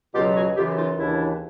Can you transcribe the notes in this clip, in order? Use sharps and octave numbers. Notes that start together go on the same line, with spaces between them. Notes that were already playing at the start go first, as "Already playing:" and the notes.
C#2 B2 F#3 F4 G4
F#4 G#4
F#2 C#3 E3 F4 G4
D#4 F4
D#2 C#3 E3 D4 E4